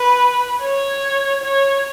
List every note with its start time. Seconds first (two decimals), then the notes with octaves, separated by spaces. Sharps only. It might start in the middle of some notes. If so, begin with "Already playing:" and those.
Already playing: B4
0.61 C#5
1.43 C#5